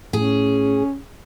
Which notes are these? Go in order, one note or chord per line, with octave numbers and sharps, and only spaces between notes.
A2 C#4 G#4